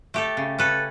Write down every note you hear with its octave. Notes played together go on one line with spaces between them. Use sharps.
A3 G4 A4
C#3
C#4 A4 B4